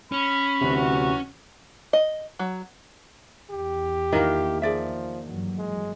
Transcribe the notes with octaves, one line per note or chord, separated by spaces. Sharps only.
C#4 B5
D2 C3 E3 F#3 F#4
D#5
F#3
E2 G4
D#3 A#3 E4 F4 D#5
F3 G#4 D5 E5
G2 E3 F#3
G#3